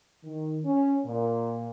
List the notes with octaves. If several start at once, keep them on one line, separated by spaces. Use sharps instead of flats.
D#3
C#4
A#2